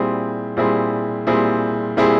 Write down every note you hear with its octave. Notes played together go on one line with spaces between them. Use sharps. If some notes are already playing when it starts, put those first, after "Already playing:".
Already playing: A#2 G3 C4 E4 G#4
A#2 G3 C4 E4 G#4
A#2 G3 C4 E4 G#4
A#2 G3 C4 E4 G#4